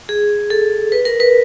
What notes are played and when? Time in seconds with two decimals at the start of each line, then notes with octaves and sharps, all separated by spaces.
0.09 G#4
0.50 A4
0.92 B4
1.05 A#4
1.20 B4